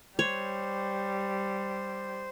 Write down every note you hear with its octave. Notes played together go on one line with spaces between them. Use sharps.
G3 C5 C#5